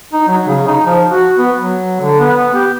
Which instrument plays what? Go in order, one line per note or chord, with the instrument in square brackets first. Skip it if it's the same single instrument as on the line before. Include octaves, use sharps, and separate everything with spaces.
[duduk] D#4
F#3
C#3
D#4
F3
F#4
B3
F#3
D3
B3
G4